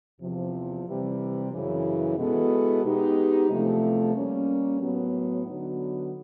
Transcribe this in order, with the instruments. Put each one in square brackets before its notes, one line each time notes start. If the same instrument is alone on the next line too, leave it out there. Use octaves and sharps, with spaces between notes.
[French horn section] E2 C3 F3
C3 E3 G3 C4
F#2 C#3 E3
B2 G#3 B3 E4 A4
G#3 B3 D#4 G4
E2 C3 F3 A3
G3 A#3 C#4
A2 F#3 B3
D3 F#3 B3 D#4 F#4